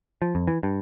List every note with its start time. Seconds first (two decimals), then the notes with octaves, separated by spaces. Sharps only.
0.22 F3
0.35 F2
0.48 E3
0.63 G2